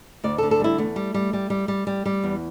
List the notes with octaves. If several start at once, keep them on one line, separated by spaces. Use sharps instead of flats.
D2 D5
A4
D3
A4
G3 E4
E2 A3
G3
G3
G3
G3
G3
G3
G3
E2